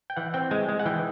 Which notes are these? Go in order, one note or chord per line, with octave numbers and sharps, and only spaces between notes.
G5
E3 F#5
C4 G5
G#3 G#5
G#3
F#5
E3 G5